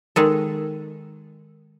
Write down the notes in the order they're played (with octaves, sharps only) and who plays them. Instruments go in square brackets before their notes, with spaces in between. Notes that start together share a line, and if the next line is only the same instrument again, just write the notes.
[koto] D#3 G#3 A4